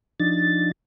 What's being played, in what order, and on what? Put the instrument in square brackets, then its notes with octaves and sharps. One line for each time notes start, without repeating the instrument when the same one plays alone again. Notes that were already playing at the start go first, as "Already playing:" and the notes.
[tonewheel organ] F3 D4 D#4 A6